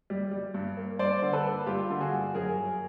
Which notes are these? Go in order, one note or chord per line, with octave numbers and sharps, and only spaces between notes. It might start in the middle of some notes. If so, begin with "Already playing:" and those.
G3
G3
G2
A#3
G2 C5 D5
D3
A4 B4
A#3
G3 F4 G4
D3
F#4 G#4
G2
F#2 G#4 A#4
F#2